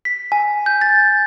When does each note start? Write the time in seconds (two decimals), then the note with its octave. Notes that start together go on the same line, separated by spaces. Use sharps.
0.05 B6
0.32 G#5
0.66 G6
0.81 A6